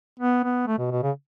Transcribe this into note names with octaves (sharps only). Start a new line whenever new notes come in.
B3
B3
A3
B2
B2
C#3